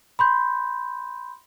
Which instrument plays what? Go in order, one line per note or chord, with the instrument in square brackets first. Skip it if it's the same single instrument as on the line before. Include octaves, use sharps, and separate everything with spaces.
[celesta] B5 C6 G6